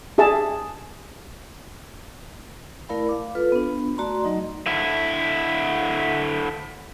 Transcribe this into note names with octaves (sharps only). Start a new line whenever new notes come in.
G4 G#4 E5 A5
A3 E4 A#4 D5 F5 B5
F5 D6
F4 A4 B4
B3 D4
A3 F#4 D5 A#5 C6
F#3 D#4 D#5
D3 E4